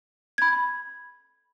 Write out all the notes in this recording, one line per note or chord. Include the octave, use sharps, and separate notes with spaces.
B5 G#6